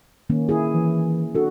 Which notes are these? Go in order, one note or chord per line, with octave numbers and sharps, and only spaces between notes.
D#3 A#3 C#4
E4 G#4
E3
D4 F#4 A4